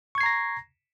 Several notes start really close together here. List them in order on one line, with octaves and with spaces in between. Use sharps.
C#6 G#6 C7 A#5 A#6